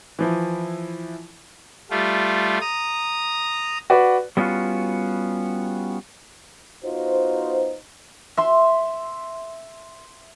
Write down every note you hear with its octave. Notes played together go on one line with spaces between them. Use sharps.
E3 F3 E4
G3 A3 F4
A#5 D#6
F#4 B4 D5
G3 B3 C#4 D#4 F4 F#4
B3 D#4 F4 F#4 C5
E5 C6